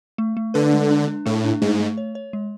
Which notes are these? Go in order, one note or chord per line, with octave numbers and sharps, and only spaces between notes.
A3
A3
D3 B4
G#3
D4
D4
A2 A3
D4
G#2 A3
A3
C#5
C#5
G#3